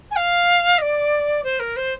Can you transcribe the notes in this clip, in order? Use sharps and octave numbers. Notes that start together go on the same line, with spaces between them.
G#5
F5
D#5
D5
C5
A#4
C5